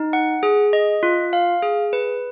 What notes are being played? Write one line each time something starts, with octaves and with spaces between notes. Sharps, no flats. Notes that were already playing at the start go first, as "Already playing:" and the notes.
Already playing: D#4
F#5
G#4
D#5
F4
F5
G#4
B4